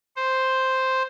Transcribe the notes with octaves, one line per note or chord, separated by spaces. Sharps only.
C5